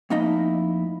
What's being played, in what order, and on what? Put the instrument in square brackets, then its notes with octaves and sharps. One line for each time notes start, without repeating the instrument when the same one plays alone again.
[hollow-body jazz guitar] F2 A3 A#3 D#4 E4 D#5